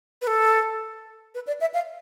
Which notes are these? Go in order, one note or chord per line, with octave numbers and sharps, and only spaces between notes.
B4
A4
B4
D5
E5
F5